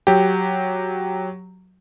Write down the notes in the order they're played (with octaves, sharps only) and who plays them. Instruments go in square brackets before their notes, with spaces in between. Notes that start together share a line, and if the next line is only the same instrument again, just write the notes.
[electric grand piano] F#3 G4